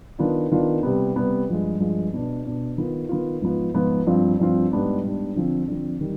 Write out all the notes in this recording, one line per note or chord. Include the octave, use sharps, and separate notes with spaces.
D#3 B3 D4 F4
D#3 B3 D4 F4
C3 G3 B3
C3 G3 B3
G2 F3 G#3
G2 F3 G#3
B2 B3 D4
B2 B3 D4
D#3 B3 F4
D#3 B3 F4
G#2 F3 B3 F4
G#2 F3 B3 F4
G2 F3 C4 F4
G2 F3 C4 F4
G#2 G3 B3 D4
G#2 G3 B3 D4
D3 F3 C4
D3 F3 C4
D#3 G3